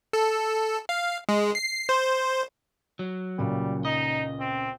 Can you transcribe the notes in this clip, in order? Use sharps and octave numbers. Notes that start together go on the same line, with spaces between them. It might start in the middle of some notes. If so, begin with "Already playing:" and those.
A4
F5
G#3
C7
C5
F#3
C#2 A#2 C#3 G3
D#4 D#5
C4